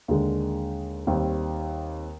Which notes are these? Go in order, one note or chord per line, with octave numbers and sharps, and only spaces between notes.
D#2 D3 G#3
D#2 D#3 G3 C4